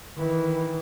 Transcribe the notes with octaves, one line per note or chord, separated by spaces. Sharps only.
D#3 E3